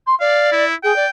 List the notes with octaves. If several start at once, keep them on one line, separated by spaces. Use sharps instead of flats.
C6
D5 F5
E4
G#4 G5
D5